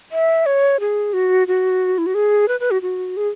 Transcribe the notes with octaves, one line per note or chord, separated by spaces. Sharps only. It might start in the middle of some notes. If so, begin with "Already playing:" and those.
E5
C#5
G#4
F#4
F#4
E4
F#4
G#4
B4
B4
F#4
F#4
G#4